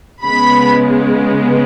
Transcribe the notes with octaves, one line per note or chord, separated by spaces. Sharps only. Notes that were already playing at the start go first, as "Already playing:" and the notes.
C#3 G#3 B3 B5